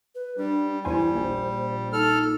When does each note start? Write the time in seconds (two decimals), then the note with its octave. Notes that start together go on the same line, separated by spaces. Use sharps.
0.15 B4
0.38 G3 D4
0.85 E2 G3 E4 C5 G#5
1.15 A#1 C5
1.93 D#4 A4 F6